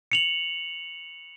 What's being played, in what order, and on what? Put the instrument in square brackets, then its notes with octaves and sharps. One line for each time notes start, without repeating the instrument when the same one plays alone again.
[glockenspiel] C#7 F7 F#7